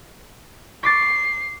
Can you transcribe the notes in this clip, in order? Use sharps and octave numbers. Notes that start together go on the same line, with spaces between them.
C#6 D6 A6 C7